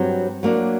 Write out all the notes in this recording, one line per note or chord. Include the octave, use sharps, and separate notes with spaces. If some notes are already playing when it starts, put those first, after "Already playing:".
Already playing: G2 F#3 C4 G4
F#3 A#3 D4